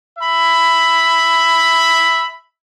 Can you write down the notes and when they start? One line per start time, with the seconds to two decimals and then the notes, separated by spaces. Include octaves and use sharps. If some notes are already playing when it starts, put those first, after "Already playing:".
0.19 E5 B5